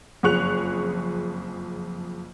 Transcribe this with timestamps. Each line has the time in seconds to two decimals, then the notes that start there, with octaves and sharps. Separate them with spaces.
0.23 F#1 F2 G#4 C#6 F#6 F7